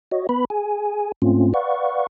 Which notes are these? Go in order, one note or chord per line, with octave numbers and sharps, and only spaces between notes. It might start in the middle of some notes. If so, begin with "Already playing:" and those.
F#4 C#5 D#5
B3 B4 B5
G#4 G#5
G#2 A3 C4 C#4 F4
B4 D5 F5 F#5 C#6